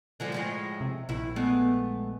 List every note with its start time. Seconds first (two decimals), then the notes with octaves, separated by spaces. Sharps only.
0.20 D3 F3 G#3
0.32 A2 F3 G#3
0.81 C3
1.09 A#1 D#2 E4
1.36 G#3 A3 B3